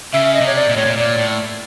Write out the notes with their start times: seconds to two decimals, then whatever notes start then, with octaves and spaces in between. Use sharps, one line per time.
0.13 C#3 E5
0.34 D#5
0.41 C3
0.46 C#5
0.55 D5
0.69 A#2
0.76 A2 C#5
0.86 A#2
0.97 A#2 D5
1.18 A2